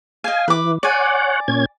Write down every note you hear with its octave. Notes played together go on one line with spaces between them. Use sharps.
D#5 F5 G#5
E3 B4 D6
C#5 D5 F#5 G#5
A#2 C#4 G#6